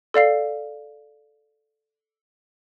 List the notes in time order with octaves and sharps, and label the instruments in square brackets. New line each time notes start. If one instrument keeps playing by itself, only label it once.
[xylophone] A4 D5 F5 C7